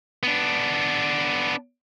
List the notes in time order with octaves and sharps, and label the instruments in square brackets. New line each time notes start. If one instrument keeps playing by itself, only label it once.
[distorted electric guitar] B3 D4